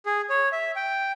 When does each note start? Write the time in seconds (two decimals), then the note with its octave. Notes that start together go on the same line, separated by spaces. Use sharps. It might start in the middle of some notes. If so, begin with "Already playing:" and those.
0.06 G#4
0.30 C#5
0.52 E5
0.76 G5